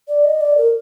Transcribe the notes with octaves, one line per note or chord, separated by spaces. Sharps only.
D5
D#5
D5
A#4